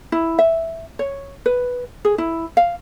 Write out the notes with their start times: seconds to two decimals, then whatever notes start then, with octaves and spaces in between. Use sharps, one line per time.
0.12 E4
0.39 E5
0.99 C#5
1.46 B4
2.05 G#4
2.18 E4
2.57 F5